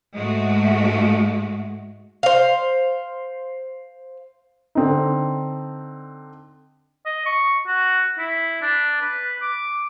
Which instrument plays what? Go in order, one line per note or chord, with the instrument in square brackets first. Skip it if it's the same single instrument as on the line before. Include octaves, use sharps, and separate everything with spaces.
[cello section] G#2 G#3 A3 F#4
[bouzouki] C5 F5
[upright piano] D3 C4 D#4
[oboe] D#5
C#6
F#4
E4
D4
B4
D6